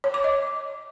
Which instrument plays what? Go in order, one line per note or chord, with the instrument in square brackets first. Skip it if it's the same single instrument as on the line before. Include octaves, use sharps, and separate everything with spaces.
[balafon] C#5
D6
D#5